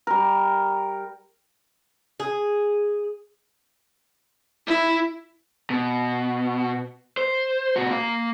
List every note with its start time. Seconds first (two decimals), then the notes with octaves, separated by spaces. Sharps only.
0.07 G3 A#4
2.20 G#4
4.67 E4
5.70 B2
7.17 C5
7.76 A#2 F#4
7.90 A#3 F5